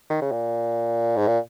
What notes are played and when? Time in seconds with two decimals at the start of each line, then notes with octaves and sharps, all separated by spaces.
0.10 D#3
0.21 C#3
0.32 A#2
1.17 G#2
1.27 A#2